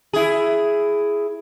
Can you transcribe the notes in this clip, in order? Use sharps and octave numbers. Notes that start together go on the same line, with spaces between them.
E4 G#4